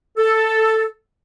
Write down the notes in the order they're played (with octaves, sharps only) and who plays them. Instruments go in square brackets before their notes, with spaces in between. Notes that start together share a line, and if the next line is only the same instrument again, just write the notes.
[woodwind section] A4